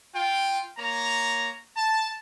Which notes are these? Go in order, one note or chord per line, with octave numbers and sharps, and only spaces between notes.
F4 G5
A#3 C#5 A#5
A5